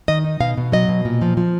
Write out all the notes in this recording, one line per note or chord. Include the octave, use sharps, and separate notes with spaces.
D#3 D#5
D#4
B2 F5
B2
F#3 D#5
B2
A#2
F3
F3